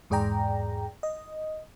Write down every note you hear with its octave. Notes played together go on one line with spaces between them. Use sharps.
E2 G#2 G#4 D5 G5 A#5
D#5